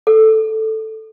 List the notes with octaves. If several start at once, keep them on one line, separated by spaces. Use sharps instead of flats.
A4